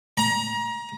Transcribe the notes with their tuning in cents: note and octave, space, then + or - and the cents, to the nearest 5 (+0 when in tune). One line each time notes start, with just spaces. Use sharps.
A#5 +30